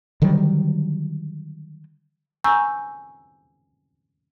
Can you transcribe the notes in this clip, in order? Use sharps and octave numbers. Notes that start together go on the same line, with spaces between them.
D3 D#3 F#3 G3
G#5 A#5 C#6 E6 G6